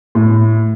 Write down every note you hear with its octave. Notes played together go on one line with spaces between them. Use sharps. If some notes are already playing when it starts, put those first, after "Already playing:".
A2